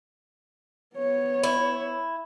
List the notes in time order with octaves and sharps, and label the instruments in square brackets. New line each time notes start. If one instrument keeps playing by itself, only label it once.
[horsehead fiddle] B3 C#5
[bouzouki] E4